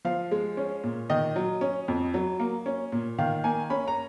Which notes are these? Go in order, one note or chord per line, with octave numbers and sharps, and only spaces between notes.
F3 F5
G#3
C#4
A#2
D#3 D#5
F#3
C#4
F2
F#3
A#3
C#4
A#2
D#3 F5
A#3 G#5
C#4 B5
A#5